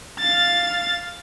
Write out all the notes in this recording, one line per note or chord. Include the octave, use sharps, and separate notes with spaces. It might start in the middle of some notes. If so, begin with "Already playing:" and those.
F5 A6